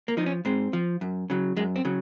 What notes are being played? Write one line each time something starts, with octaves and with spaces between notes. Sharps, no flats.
A#3
F3 D#4
C#4
G#2 C4
F3
F#2
C#3 F#3
F#2 G#3
C4
C#3 F#3